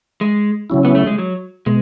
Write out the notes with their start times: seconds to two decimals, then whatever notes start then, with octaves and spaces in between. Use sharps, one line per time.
0.21 G#3
0.70 C#3 F#3 C#4 E4
0.85 B3
0.95 A3
1.07 G#3
1.18 F#3
1.66 B2 G#3